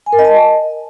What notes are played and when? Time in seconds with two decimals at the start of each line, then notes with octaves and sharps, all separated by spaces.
0.06 G#5
0.13 A#4
0.19 D#5
0.25 A5